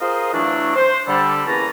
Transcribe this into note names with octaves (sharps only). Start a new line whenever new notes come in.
F4 G#4 A#4 C5 D#5 F5
E3 F#3 A3 D4
C5
D3 G3 A4
E2 A#3 C#4 B4 A5 A#5